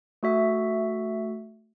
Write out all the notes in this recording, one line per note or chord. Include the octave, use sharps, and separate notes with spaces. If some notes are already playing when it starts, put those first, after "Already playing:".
A3 F#4 E5